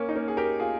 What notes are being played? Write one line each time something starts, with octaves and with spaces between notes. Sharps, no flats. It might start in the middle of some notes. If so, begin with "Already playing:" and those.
Already playing: A#3 C#4
D#4
A#3 C#4
G#4
G4 A#4
F4 G#4